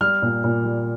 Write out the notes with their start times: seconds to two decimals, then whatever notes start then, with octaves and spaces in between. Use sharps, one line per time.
0.01 G3 F6
0.22 A#2
0.44 A#2
0.64 G3